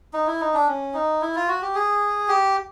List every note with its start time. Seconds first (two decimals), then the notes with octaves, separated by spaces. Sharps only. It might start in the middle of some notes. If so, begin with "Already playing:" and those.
0.13 D#4
0.27 E4
0.41 D#4
0.54 D4
0.68 C#4
0.94 D#4
1.22 E4
1.35 F4
1.48 F#4
1.62 G4
1.75 G#4
2.28 G4